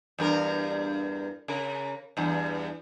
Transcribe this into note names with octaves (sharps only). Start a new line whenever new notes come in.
E2 G2 A#4
C#3 A#4
E2 G2